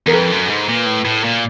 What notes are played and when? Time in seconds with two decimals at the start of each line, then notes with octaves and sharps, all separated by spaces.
0.07 E2 A#4
0.13 F2 A4 B4
0.32 F#2
0.49 G#2
0.69 A#2
0.86 A2
1.05 A2
1.24 A#2